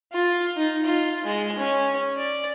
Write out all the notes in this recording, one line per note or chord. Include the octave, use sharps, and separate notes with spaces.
F4
D#4
F4
G#3
C#4
D5